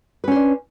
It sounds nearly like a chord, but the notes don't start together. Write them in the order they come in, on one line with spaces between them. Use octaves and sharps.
B4 C#4 C5 D4